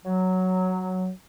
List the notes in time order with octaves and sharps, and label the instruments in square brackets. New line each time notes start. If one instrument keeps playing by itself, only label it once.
[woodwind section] F#3